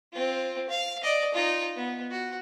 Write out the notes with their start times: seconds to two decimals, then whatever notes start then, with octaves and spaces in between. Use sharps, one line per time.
0.13 C4 F4
0.69 F5
1.03 D5 D#5
1.34 D#4 F4
1.76 B3
2.11 F#4